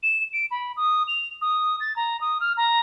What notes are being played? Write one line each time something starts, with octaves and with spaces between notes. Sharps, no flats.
E7
D7
B5
D#6
F7
D#6
A6
A#5
D#6
F6
A#5